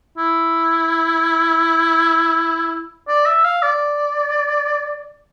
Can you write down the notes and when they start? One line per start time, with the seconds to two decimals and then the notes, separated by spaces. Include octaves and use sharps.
0.17 E4
3.08 D5
3.26 E5
3.44 F5
3.62 D5